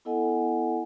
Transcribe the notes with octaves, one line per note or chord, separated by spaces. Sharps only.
B3 E4 A4 D#5 F#5 G#5